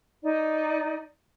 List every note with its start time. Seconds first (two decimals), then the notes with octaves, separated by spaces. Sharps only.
0.23 D#4 D5